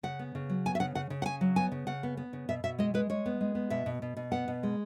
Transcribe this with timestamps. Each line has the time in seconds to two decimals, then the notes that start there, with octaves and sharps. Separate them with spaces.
0.03 C#3 F#5
0.19 B3
0.35 C#3
0.50 F#3
0.66 B3 G#5
0.75 E5
0.80 C#3 F#5
0.95 C#3 F#5
1.10 C#3
1.22 F#5
1.26 C#3 G#5
1.41 F#3
1.56 B3 G#5
1.72 C#3
1.87 C#3 F#5
2.03 B3
2.17 B3
2.33 C#3
2.49 B2 E5
2.64 B2 E5
2.79 G#3 D#5
2.94 G#3 B4
3.10 G#3 C#5
3.26 B3
3.41 G#3
3.55 B3
3.70 B2 E5
3.86 B2
4.02 B2
4.17 B2
4.32 B3 F#5
4.48 B2
4.63 G#3